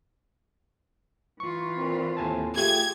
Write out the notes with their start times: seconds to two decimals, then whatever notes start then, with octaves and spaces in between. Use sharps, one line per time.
1.40 E3 F4 C#6
1.77 A#2 C4
2.17 D#2 A2 C4 G#5 A5
2.57 A3 F4 G4 G#4 G#6